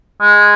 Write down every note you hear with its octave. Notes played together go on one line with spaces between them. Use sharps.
G#3